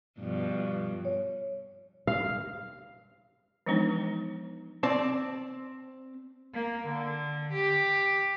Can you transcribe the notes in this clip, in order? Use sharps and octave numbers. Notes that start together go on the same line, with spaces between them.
G2 B2 F3
C#5
F5
E3 F3 G#3 B3 D4 D#4
C4 D5 A5
A#3
D3
G4